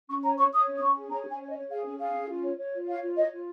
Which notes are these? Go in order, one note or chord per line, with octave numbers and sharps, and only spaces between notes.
C#4 C#6
C#5 A#5
C#5 C#6
C#5 D#6
C#4
D#6
C#4 C#6
G#4
C#5 A#5
C#4 G#5
C#5
D#5
C#5
G#4 F5
C#4
G#4 F5
C#4
F4
C#5
C#5
F4
C#5 F5
F4
C#5 D#5
F4